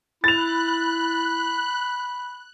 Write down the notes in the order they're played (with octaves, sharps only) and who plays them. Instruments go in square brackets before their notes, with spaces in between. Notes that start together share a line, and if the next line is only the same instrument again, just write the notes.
[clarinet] E4 [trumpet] B5 [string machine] F#6 [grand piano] A6 F7